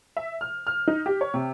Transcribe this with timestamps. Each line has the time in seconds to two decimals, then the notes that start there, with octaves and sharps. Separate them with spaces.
0.17 E5
0.41 F6
0.67 F6
0.88 D#4
1.06 G4
1.21 C#5
1.34 C3